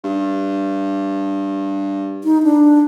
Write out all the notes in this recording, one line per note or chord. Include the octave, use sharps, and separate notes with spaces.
G2
D#4
D4